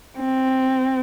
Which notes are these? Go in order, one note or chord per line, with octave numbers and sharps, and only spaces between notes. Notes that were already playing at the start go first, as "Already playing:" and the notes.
C4